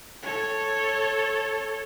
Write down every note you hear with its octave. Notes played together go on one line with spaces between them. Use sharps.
A4 C#5